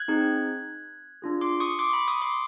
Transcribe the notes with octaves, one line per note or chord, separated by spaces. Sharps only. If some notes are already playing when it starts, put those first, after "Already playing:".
Already playing: F#6 G#6
C4 D#4 G#4
D4 F4 G#4
C6 D6
C#6 D#6
C6 D6
B5 C#6
C#6 D#6
C6 D6